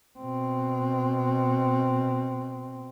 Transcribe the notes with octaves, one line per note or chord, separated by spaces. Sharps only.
B2 C4